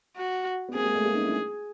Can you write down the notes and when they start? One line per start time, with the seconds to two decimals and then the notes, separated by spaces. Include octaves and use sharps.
0.17 F#4
0.69 B3
0.75 A#3 C4 G#4
0.85 G#3 A#3
0.95 A3
1.05 G#3 A#3
1.14 C#4 D#4
1.24 D4 E4